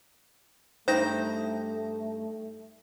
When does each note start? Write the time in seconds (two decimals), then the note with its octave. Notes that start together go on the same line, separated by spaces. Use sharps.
0.88 G2 A3 D#4 C5 G5 G6 A#6